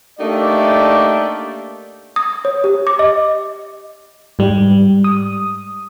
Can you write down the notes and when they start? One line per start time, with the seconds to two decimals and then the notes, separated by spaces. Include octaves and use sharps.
0.19 A3 A#3 D4 D#4 G4 D5
2.16 D#6
2.45 C#5
2.64 G4
2.87 D6
2.99 D#5
4.39 G#2 G3
5.04 D#6